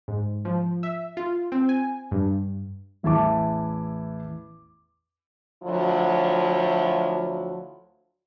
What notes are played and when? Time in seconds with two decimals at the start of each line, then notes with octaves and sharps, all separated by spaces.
0.08 G#2
0.45 F3
0.83 E5
1.17 F4
1.52 C4
1.69 G#5
2.11 G2
3.03 A1 E2 E4 E5 A5 D6
5.64 D2 F3 F#3 E4